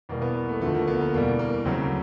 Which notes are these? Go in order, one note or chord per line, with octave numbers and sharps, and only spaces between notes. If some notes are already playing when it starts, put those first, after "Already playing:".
E2 B2 G3 A#3
B3
A#3
A3
D2 D3 F3 A3
A#3
B3
A#3
E2 B2 G3 A#3
A#3
D2 C#3 F#3 C4